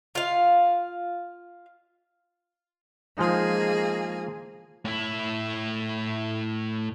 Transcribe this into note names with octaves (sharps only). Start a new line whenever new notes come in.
F4 F5
F3 G#3 A#3 D#4 G#4
A2 E4